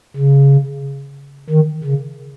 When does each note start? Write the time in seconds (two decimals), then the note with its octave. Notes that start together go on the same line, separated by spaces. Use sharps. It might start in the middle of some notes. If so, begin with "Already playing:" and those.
0.17 C#3
1.50 D#3
1.84 C#3